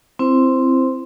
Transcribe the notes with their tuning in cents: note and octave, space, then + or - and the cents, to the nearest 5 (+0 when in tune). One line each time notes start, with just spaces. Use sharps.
C4 +0 E4 +20 C5 +0